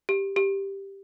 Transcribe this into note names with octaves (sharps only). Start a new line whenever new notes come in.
G4
G4